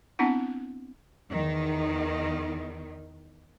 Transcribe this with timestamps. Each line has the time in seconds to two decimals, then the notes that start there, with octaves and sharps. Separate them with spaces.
0.19 B3 C4 D4 E4 F#5
1.29 E2 D#3